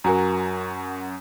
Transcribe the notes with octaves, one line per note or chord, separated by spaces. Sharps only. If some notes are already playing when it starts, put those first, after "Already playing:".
F#2 F#4 A#4 G#5 A#5